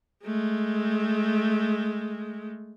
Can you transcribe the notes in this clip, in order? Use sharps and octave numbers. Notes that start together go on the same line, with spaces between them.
G#3 A3